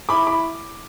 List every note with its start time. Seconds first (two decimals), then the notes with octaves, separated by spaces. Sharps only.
0.09 E4 B5 D6
0.27 E4 B5 D6